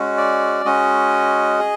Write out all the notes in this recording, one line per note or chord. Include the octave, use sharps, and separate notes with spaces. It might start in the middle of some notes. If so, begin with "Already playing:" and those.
Already playing: G#3 C#4 F#4
D5
G#3 C#4 F#4 D#5
G#4